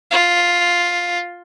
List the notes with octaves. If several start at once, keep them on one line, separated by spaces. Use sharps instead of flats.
F4